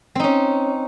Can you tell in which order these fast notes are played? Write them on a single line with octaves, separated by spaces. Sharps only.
C4 D#4 C#4